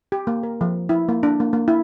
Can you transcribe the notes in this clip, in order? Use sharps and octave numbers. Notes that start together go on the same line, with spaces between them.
G4
A#3
A#4
F3
E4
A#3
D4
A#3
A#3
E4